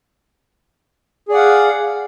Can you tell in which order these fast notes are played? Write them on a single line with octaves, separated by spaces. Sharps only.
G#4 D5 F#5 F5